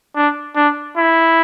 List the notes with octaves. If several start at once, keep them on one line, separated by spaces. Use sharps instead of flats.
D4
D4
E4